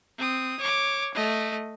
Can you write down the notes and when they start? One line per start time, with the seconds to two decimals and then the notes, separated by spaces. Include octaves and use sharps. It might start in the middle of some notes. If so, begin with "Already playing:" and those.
0.18 C4 D#6
0.59 C#5 D6
1.14 A3 D#5